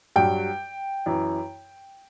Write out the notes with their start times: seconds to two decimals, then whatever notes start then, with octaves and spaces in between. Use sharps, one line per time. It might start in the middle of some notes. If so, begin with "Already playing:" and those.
0.16 G2 F#3 G5
1.06 F#2 E3